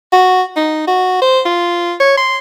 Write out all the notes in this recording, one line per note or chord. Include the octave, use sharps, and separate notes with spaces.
F#4
D#4
F#4
C5
F4
C#5
C6